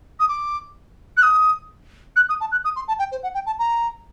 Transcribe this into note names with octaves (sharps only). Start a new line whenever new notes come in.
D#6
D6
F#6
D#6
F#6
D#6
A5
F#6
D#6
C6
A5
G5
C5
F#5
G5
A5
A#5